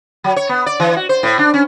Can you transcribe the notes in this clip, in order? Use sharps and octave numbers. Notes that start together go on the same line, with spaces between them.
F#3
C#5
B3
D5
E3
F#4
C5
A2
D4
C#4